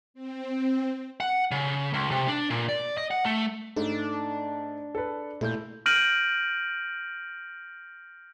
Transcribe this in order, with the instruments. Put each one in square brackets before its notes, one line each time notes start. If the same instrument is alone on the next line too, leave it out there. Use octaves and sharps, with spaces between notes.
[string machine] C4
[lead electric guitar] F#5
C#3
C#2
C3
D4
A#2
D5
D#5
F#5
A3
[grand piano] G#2 A3 [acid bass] D4
[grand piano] A4 B4
[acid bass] A#2 [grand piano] A3 E4 G6
[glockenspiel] F6 G6 A#6 D7 D#7 F#7